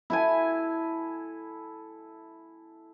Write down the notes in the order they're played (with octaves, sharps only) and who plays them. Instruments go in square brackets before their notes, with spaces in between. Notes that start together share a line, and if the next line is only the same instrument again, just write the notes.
[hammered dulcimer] E4 A4 G#5